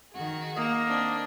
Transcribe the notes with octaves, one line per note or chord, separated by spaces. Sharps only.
D#3 F#4 G#4
A#3 D#5
C4 D4